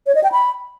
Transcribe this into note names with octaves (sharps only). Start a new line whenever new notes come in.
C#5
D#5
G5
B5